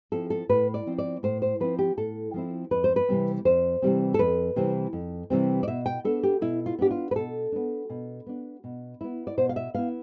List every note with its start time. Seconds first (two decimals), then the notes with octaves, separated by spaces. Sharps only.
0.12 F3 C4 E4 A4
0.30 A4
0.49 A2 B4
0.74 D5
0.86 F3 C4 E4
0.98 D5
1.23 A2 C5
1.42 C5
1.60 F3 C4 E4 B4
1.79 G4
1.97 A2 A4
2.34 F3 C4 E4
2.71 F2 B4
2.84 C5
2.96 B4
3.08 C3 E3 G3 C4
3.45 F2 C5
3.82 C3 E3 G3 C4
4.14 A4
4.19 F2 B4
4.56 C3 E3 G3 C4
4.93 F2
5.30 C3 E3 G3 C4
5.63 D5
5.68 B2 E5
5.86 G5
6.04 B3 D4 A4
6.23 G4
6.41 B2 E4
6.66 F4
6.78 B3 D4 G4
6.91 F4
7.11 B4
7.16 B2 A4
7.52 B3 D4
7.90 B2
8.26 B3 D4
8.64 B2
9.01 B3 E4
9.27 D5
9.37 B2 C5
9.49 F5
9.56 E5
9.74 B3 E4 F5